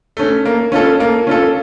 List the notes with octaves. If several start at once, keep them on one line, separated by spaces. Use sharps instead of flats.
A3 C#4
A#3
C#4 F4 A4
A#3
C#4 F4 A4